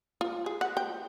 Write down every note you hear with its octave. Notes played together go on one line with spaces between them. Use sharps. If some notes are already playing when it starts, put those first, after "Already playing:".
F4
G#4
F#5
G5